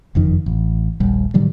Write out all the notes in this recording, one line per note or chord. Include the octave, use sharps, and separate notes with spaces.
F#1 F2 D#3
A1
D#1 A#1 G3
A2 D#3 F#3 G3